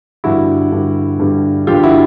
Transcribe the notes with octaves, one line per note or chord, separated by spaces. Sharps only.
G2 D3 G3 E4 F#4
G2 D3 G3
G2 D3 G3
G2 D3 G3 F4 G4
E4 F#4